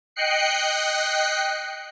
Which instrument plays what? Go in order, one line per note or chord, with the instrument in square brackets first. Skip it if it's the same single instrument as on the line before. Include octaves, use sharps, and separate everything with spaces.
[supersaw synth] D#5 G5 F#6 C7 C#7